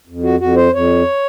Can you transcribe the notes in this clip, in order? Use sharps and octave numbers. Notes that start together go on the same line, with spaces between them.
F2
F#4
F2 F#4
C5
F2 C#5